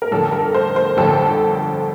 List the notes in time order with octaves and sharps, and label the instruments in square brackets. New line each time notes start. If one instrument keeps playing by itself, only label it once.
[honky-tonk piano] A#4
G1 F2 D3 A4
A#4
C5
C5
G1 F2 D3 A4